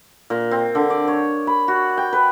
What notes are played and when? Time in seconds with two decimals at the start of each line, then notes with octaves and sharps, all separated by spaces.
0.30 A#2
0.51 C4
0.75 D3
0.90 D5
1.08 C#5
1.47 B5
1.68 F#4
1.97 G5
2.13 B4